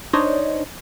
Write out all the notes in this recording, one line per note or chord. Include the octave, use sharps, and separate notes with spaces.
D4 D#4 C5 C#5 D#5